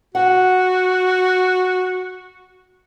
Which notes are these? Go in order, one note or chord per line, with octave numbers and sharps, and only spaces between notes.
F#4 F#5